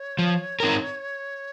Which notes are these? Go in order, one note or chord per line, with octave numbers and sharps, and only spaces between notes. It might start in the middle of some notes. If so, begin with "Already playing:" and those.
Already playing: C#5
F3
C4 D#4 A#4